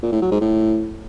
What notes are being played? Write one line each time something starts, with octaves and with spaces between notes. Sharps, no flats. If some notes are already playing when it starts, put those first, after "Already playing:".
A#2
A2
F#3
G#2
A2